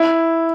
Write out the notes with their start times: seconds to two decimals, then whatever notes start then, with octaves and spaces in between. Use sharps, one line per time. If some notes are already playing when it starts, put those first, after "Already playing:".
Already playing: E4